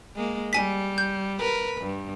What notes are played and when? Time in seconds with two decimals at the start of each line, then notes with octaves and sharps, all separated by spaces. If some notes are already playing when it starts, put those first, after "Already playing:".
0.15 G#3 A#3
0.53 G3 G#5 B6
0.98 G6
1.39 A#4 B4
1.81 G2